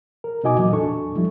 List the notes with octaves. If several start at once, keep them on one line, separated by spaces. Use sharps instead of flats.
A#4
B2 D#4 F#4 D#5 G#5 D6
A#2 E3 F#3
E2 D4 A4 C#6
F3 G3 E4